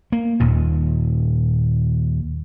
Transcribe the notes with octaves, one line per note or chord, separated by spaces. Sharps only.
A#3
D#1 D#2 A#2